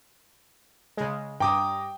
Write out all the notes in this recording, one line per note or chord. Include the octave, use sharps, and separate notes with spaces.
C#3 G#3
G2 G5 A#5 D6 D#6